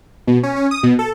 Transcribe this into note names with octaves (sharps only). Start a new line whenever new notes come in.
B2
C#4
C#4
D#6
B2
A4